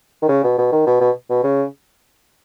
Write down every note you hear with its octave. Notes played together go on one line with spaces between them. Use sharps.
D#3
C#3
B2
B2
D#3
B2
B2
B2
C#3